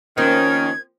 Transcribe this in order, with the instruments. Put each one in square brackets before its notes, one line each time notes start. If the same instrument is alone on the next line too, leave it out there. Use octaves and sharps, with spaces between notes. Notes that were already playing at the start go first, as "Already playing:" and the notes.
[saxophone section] D#3 [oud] F3 A#3 C4 [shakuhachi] C#4 [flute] G#6